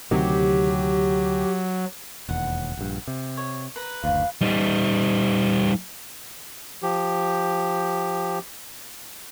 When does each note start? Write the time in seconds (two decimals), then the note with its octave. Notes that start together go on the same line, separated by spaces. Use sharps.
0.11 D2 C3 D#3 F#3 G4
2.29 E1 D#2 F#5
2.77 A#1 G2
3.08 C3
3.37 C#5
3.76 B4 A#5
4.04 F#1 D2 F5
4.41 G3 D#4
6.83 F3 G4